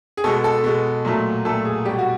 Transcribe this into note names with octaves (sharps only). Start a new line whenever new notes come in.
G#4
B2 G#3 A4
A4
B2 G#3
A#2 F#3 A3
A#2 F#3 A3 A4
G#4
B2 G3 G4
F#4